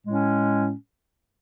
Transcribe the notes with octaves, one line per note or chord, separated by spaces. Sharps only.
A2 G#3 C#4